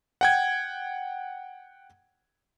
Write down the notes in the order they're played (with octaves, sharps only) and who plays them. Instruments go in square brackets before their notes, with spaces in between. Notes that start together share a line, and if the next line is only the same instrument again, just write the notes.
[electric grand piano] F#5 G5 G#6